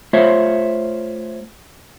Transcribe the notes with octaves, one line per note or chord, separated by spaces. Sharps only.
A3 F4 C5 C#5 E5